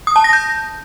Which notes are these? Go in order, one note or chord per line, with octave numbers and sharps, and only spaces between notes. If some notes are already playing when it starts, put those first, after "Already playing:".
D#6
A5
A#6
G6